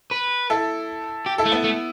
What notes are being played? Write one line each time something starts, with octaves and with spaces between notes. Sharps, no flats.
B4
E4 A4
G4
E4 A4
A3
B3 E4
A3